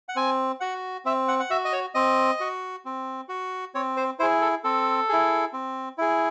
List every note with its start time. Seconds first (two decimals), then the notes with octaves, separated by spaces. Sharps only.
0.09 F#5
0.16 C4 G#5
0.60 F#4 F#5
1.05 C4 E5
1.28 F#5
1.40 F#5
1.50 F#4 E5
1.65 D#5
1.73 C#5
1.95 C4 D#5
2.40 F#4
2.85 C4
3.29 F#4
3.75 C4 C#5
3.97 C5
4.19 E4 G#4 C5
4.41 A4
4.64 C4 A4
5.09 E4 G#4
5.53 C4
5.98 E4 G#4